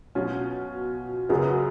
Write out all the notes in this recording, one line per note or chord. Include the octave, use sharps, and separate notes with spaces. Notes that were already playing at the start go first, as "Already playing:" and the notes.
B2 F#3 C#4 F4
F#2 C#3 F#3 B3